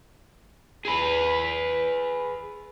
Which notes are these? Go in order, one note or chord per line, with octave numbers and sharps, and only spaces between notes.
G#4 B4